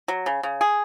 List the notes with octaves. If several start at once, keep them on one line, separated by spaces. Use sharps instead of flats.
F#3
C#3
C#3
G#4